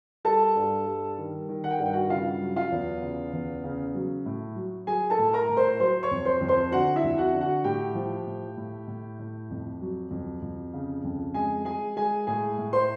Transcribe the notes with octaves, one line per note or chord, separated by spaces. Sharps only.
G3 A4 A5
G2
G3
D#3
D#3
F#5
G5
G2 F#5
G5
F#4 F#5
C#3 F4 F5
F#3
F4 F5
E2
C#3
E2
C#3
F#3
A2
F#3
F#3 G#4 G#5
A4 A5
A2
A#4 A#5
A2
C5 C6
F#3 C5 C6
C#5 C#6
F2
C5 C6
F2
C5 C6
D3 F#4 F#5
E4 E5
F2
F#4 F#5
D3
F#4 F#5
A2 G4 G5
F3
A2
A2
A2
A2
F2
F#3
F2
F2
C#3
F2
G#3 G#4 G#5
G#3 G#4 G#5
G#3 G#4 G#5
A2 G#4 G#5
A2
C5 C6